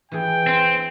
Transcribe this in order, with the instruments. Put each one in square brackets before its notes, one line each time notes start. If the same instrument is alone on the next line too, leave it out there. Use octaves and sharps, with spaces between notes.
[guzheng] E3 G#4 [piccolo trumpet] G5
[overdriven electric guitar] C4